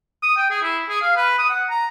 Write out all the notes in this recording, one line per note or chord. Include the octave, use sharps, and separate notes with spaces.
D#6
G5
G#4
E4
G#4
F5
B4
D#6
F#5
A#5